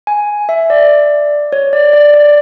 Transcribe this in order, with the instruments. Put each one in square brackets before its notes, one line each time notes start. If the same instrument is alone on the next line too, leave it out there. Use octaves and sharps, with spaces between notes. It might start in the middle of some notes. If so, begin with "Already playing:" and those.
[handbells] G#5
E5
D5
C#5
D5
D5
D5